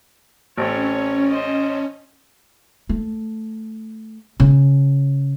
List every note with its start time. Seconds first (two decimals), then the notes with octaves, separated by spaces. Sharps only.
0.57 A1 A3 C4 C#4 C#5
1.30 C5 D#5
2.89 A3
4.40 C#3